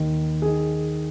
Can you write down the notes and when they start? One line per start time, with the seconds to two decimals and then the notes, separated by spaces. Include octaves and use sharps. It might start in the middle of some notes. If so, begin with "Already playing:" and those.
Already playing: D#2 D#3
0.42 D#3 G#4